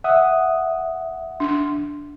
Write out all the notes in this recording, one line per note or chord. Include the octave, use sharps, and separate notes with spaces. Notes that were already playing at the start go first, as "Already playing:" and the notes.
E5 F#5 D#6
D4